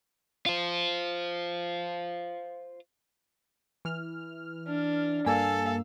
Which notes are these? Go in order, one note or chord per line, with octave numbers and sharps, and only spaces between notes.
F4 C5
E3 F6
D4
G2 A#3 A4 F5 G#5 E6